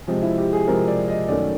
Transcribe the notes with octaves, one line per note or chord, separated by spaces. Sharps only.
C3 F3 G#3 C4
E4
G4
G#4
C3 F3 G#3 C4 A#4
D5
D#5
F#2 D#3 F#3 A3 C#4 D5